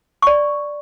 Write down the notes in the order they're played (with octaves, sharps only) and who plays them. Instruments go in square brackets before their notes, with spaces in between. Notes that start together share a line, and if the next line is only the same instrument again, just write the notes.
[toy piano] D5 C#6